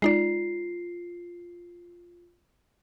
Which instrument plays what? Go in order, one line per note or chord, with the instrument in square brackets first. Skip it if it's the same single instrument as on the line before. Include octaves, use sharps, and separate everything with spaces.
[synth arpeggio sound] G#3 D#4 D5 [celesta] F4 C7